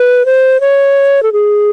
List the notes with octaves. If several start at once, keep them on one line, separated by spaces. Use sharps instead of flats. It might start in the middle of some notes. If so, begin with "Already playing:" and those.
Already playing: B4
C5
C#5
A4
G#4